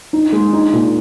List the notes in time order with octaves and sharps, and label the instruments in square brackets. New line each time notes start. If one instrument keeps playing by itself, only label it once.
[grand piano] D#4
G#3
D#4
A#2